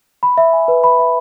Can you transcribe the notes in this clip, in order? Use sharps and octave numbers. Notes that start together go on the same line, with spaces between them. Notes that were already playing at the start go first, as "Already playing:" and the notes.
B5
E5
G#5
B4
B5
E5